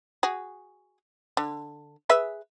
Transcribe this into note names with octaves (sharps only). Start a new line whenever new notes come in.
F#4 G#4
D3
G#4 B4 E5